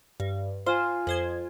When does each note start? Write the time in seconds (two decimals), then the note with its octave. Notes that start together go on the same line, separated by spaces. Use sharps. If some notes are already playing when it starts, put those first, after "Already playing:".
0.20 G2
0.66 F4 C5 G#5
1.07 F2 C5 G#6